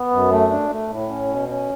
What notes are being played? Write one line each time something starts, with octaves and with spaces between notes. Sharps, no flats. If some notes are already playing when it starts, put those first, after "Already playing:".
Already playing: B3
F#2
A3
D4
A3
A2
C#4
B2
C#4